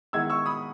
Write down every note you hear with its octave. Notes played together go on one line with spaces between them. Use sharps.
D#3 G#3 B3 E4 E6 G#6
C#6 E6
B5 D#6